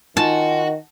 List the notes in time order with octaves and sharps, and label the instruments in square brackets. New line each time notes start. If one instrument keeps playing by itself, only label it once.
[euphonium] D#3 [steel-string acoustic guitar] D#4 F4 G#5 [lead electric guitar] F#4 [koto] A5